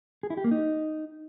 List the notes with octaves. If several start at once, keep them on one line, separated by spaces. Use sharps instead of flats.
G#4
E4
G4
A#3
D#4